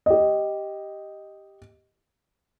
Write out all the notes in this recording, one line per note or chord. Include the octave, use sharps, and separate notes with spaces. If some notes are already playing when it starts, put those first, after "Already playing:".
G4 D#5